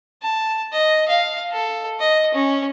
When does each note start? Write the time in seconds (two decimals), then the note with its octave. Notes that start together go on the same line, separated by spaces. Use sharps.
0.22 A5
0.73 D#5
1.08 F5
1.52 A4
2.00 D#5
2.34 C#4